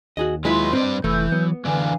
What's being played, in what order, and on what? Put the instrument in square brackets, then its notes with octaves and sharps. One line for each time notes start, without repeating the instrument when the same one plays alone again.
[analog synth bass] D#2 [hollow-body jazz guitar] F#4 G#4 D#5
[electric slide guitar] F#3 B4 [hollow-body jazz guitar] G#3 E4 F4 [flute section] D#5 C6
[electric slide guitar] G2 B4 D5 [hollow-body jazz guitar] C4
[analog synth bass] F1 [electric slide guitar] E3 [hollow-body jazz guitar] A3 [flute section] E6 G6
[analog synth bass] F#3 [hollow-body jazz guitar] B3
[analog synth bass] D3 [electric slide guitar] E3 D4 [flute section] B4 F5 G#5